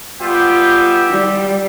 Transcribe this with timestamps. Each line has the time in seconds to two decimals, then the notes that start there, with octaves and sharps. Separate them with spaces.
0.21 G3 B3 F4 G4 E5 G5
1.10 G3